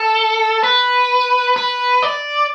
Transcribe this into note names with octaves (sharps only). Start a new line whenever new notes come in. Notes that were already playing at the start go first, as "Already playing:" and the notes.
Already playing: A4
B4
B4
D5